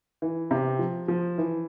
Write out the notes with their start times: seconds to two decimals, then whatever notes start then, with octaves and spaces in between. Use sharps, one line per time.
0.22 E3
0.51 C3
0.79 F3
1.08 F3
1.38 E3